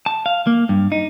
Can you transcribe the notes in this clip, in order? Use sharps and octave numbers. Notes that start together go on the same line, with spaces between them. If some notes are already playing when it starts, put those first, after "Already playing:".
A5
F5
A#3
G2
D#4